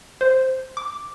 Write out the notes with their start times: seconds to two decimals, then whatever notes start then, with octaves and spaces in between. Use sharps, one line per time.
0.21 C5
0.77 D6